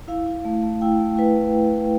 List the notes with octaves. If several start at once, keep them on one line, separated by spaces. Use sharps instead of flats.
E4 F5
E4
A3
A3
E4 G5
A3
E4 B4